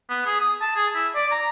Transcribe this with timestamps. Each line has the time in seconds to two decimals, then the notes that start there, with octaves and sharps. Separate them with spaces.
0.10 B3
0.26 G#4
0.41 D#6
0.61 A5
0.76 G#4
0.95 E4
1.15 D5
1.31 A#5